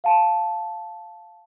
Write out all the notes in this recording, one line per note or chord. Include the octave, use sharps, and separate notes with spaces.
F5 F#5 A5